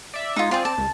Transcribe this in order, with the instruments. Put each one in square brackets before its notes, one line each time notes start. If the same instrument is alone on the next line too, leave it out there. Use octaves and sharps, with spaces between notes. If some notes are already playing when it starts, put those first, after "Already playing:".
[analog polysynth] D5 E5
[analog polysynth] G#3 [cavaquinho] D#4 F4
[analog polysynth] C4 D5 [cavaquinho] F4 G#4
[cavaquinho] A5
[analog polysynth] C#2